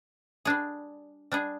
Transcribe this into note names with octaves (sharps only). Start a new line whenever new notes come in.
G3 D4 G#4
G3 D4 G#4